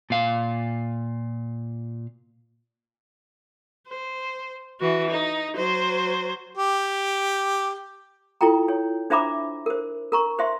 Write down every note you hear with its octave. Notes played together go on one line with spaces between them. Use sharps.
A#2 F5
C5
E3 F#4
D#4
F#3 C5
G4
E4 F4 A4 G5 A#5
C#5
D4 C5 E5 A#5 B5 D6
A#4 C5
A#4 A#5 C#6
C5 E5 C6